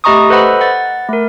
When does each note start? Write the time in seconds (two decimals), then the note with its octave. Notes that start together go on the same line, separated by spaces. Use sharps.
0.04 A3 G4 D#5 A#5 C#6 D#6
0.30 A4 B4 C5 D#5 F#5 B5
0.61 F#5 A6
1.09 A3 A#4